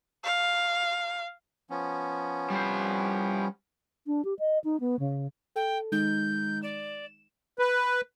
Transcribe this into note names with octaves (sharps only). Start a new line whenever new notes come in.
F5
F3 B3 C#4
G3 C5
D4
G4
D#5
D#4
B3
C#3
A4 G5
D#3 G#3 D#4 G6
D5 E7
B4